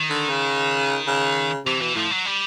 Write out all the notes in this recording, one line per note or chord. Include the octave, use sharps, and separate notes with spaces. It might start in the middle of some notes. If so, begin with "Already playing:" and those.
Already playing: D#3
D3
C#3
C#3
C3 E3
B2 E3
A2 F3
F#3
G3